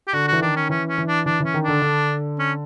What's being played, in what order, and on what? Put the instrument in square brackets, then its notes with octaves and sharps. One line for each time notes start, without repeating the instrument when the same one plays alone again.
[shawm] G4
[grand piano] D3 [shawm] F#4
[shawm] F#4
[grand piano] E3
[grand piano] D#3 [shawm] D4
[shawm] C#4
[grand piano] E3 [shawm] C#4
[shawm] C#4
[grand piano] E3
[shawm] D4
[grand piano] E3 [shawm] D4
[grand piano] E3 [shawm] C#4
[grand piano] D#3
[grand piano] D3 [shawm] D4
[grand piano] D3
[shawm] C#4